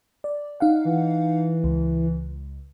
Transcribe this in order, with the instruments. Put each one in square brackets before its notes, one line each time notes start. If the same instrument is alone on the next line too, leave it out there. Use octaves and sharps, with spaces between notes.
[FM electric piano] D5
D#4 F5 F#5
[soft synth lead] E3
[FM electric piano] C#2